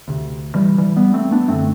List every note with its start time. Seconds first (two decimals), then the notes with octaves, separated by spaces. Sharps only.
0.08 D2 C3
0.55 E3 G3
0.78 E3 G3
0.96 G3 B3
1.14 A3 C4
1.31 B3 D4
1.48 F#2 D3 A3 C4